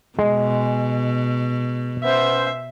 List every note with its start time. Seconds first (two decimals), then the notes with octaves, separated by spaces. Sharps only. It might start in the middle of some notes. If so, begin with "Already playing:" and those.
0.19 B2 G#3
2.04 B3 C#4 C5 E5